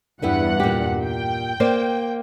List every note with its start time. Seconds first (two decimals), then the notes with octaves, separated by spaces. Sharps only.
0.22 E2 G2 G3 B3 E4 F#5
0.60 A#2 G4
1.04 G5
1.60 A#3 C5 D5